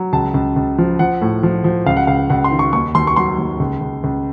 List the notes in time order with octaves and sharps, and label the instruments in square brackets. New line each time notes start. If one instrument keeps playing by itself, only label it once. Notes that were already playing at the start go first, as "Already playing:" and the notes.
Already playing: [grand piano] F#3
C#2 A5
C#2
C#2
F3
F3 F#5
A2
F3
F3
C#2 F5
F#5
C#2 F5
C#2 F#5
C6
D#3
C#6
D#2 C#6
D#2 C6
C#6
F#3 C6
D#2
C#2
C#2
C#2